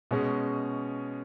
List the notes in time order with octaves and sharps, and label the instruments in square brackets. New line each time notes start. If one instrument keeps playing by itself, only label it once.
[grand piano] B2 G#3 C#4 G#4